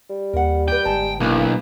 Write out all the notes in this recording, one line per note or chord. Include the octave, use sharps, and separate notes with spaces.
G3
D#2 A#4 F#5
G4 B4 G5
G1 G#2 A5
B1 D#3 A#3 D4 E4